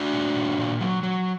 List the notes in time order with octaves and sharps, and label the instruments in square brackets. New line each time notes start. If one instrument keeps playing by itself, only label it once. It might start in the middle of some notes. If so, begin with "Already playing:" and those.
Already playing: [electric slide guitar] D4 F#4
A#2
A#2
A#2
F#3
F#3